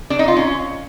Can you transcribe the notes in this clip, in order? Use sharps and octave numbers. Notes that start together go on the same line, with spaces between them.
D4
D#4
F4
C#4